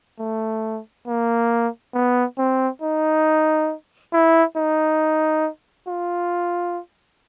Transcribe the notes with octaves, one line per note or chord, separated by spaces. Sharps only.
A3
A#3
B3
C4
D#4
E4
D#4
F4